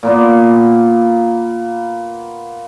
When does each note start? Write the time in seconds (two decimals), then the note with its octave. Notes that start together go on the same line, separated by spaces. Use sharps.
0.03 A#2 A#3 B3